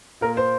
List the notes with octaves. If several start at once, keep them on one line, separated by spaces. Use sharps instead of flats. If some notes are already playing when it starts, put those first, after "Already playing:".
A#2 A#4
C5